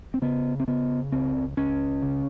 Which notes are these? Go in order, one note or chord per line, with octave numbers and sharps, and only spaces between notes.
C4
C#3 B3
C4
C#3 B3
C#2 C4
C#2 C#4
C#3